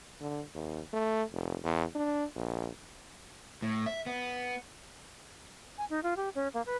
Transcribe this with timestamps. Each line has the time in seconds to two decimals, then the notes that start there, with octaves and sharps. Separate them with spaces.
0.20 D3
0.54 D#2
0.93 A3
1.33 F1
1.63 E2
1.95 D4
2.36 A#1
3.62 A2
3.86 E5
4.06 B3
5.78 G#5
5.90 D#4
6.03 F4
6.17 G4
6.35 C#4
6.54 A#3
6.66 B4